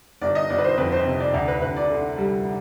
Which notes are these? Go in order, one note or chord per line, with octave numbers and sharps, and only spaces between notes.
G1 D5
D#5
G1 D5
B4
C5
F2 B4
C5
C3
D5
D2 D5
B4
D2 B4
D5
D3
G3